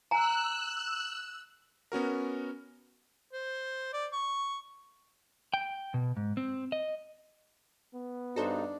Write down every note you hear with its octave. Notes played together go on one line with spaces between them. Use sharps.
G#5 A#5 E6 F#6
B3 C#4 F#4 A#4
C5
D5
C#6
G5
B2
G#2
C4
D#5
B3
G2 D4 D#4 F#4 A4 C5